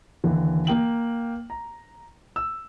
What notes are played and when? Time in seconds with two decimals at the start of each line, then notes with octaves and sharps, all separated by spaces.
0.24 D#2 D3 E3
0.67 A#3 G5 F#7
1.50 A#5
2.36 E6